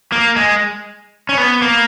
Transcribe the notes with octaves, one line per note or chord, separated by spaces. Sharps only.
A#3
G#3
C#4
B3
A#3